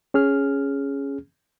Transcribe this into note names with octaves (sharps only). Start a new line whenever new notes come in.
C#4 G#4 F6